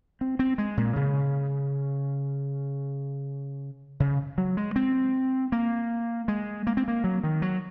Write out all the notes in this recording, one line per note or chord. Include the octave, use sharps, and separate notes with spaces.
C4
C4
G#3
A#2
C#3
C#3
F#3
G#3
C4
A#3
G#3
A#3
C4
A#3
F#3
D#3
F#3